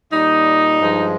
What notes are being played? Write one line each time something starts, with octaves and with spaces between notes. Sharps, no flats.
A#2 G3 D#4
G2 F3 G#3